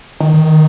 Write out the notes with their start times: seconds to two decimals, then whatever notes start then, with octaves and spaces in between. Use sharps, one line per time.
0.20 D#3
0.34 D#3